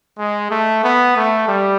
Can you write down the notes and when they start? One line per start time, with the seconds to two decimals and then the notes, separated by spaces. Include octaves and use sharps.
0.19 G#3
0.51 A3
0.84 B3
1.16 A3
1.48 G3